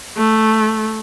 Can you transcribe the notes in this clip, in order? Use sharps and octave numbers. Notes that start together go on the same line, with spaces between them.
A3